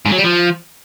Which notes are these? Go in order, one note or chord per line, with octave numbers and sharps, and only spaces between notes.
G#2
F#3
G3
F3